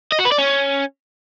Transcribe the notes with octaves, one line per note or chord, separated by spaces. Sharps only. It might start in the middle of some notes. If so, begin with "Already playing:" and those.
D#5
F#4
B4
D5
C#4